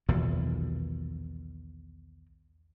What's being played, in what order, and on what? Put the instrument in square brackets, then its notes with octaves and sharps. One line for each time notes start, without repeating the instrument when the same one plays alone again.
[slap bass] B1 E2 A#2 D#3